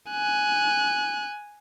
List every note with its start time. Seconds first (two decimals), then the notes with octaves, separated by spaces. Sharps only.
0.11 G#5 F#6